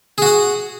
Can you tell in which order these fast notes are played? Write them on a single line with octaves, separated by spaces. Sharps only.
G#4 F#4 F#5